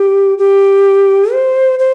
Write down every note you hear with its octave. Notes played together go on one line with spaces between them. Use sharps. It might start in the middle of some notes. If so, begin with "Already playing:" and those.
Already playing: G4
G4
C5
C5